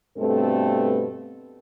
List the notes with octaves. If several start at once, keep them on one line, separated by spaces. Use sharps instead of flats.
G2 B2 A3 B3 C4 A4